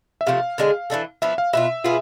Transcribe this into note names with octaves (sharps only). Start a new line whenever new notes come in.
E5
C3 F3 A3 F5
D3 G#3 D4 G#4
E3 A3 D4 A4
F3 B3 D4 E5
F5
B2 B3 F4 E5
B2 B3 F4 G#4